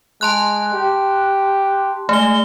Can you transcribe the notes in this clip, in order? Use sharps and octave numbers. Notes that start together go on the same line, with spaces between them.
G#3 A5 C6 F#6
G4
G#3 A3 G7